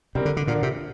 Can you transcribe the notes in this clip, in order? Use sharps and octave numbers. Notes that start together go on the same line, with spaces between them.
C3 G3 C4 A#4
D3
D3
A#2 D3 F3 D4 A#4
C3